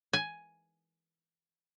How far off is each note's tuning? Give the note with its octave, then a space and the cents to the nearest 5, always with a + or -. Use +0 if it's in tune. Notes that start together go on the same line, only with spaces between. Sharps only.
G#5 +5